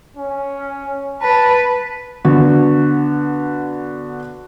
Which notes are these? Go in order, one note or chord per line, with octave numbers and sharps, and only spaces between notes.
C#4
B4 A5
D3 B3 F#4